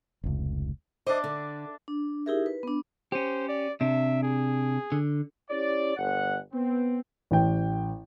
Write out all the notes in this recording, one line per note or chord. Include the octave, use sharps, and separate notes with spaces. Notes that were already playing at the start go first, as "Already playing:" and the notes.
F1 C#2
D4 C5 D#5 E5 D6
D3
D4
D#4 E4 G4 G#4 A#4 E5
B4
B3 D4
C#4 G4 C5
D5
C3 D4 E5
G#4
D3
C#4 E4 G4 C#5 D5
G1 F#5
B3 C4
A1 G5